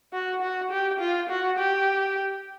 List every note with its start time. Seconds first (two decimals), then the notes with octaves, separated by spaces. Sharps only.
0.13 F#4
0.41 F#4
0.71 G4
1.00 F4
1.29 F#4
1.58 G4